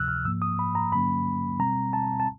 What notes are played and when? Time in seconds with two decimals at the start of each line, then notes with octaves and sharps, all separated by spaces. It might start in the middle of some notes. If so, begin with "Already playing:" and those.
Already playing: D2 C3 F3 E6 F#6
0.08 F6
0.25 G#2 F3 A#3 E6
0.42 D#6
0.59 B5
0.75 A#5
0.92 G2 D3 F#3 A#3 C#4 B5
1.59 B2 G3 C4 A#5
1.93 A5
2.20 A5